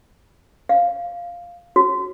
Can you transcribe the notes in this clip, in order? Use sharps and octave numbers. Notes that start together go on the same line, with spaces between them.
F5
F#4